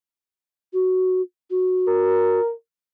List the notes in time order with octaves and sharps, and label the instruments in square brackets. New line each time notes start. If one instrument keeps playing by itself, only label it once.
[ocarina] F#4
F#4
[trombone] A#4